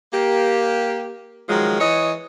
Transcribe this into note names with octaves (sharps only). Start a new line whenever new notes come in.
A#3 G4
D#3 F3 F#3 G#3
E3 C#5 D#5